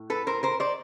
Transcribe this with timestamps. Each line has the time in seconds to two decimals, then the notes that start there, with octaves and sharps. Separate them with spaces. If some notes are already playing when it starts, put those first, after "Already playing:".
Already playing: A2
0.10 A4 B4
0.27 A#4 C5
0.43 A#4 C5
0.60 C5 D5